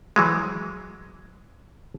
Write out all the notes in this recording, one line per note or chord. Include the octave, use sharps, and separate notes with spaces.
E3 F#3 G#3